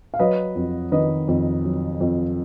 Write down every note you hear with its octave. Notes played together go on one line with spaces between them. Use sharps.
F5
F#3 B4 D#5
F2
D#3 B4 D#5
F2
F#3
F2